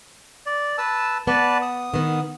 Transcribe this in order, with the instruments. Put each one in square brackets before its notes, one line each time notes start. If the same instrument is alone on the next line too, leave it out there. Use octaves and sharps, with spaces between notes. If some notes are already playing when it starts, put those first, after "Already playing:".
[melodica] D5
B4 A5 E6
[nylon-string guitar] B3 [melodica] B4 D5 A5
[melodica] D#6
[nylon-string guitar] D#3 B3